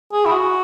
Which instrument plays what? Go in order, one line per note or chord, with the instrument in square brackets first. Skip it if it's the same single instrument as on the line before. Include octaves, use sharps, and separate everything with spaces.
[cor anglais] G#4
E4
F#4